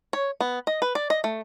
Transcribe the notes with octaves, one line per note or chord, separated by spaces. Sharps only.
C#5
B3
D#5
B4
D5
D#5
A3